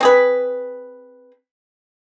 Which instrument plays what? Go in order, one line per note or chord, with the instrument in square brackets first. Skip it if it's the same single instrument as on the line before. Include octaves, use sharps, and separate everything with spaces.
[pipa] C4 G#4 B4